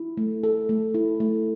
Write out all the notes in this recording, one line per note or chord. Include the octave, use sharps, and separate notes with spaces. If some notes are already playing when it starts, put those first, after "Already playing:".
Already playing: E4
A3
A4
A3
E4
A3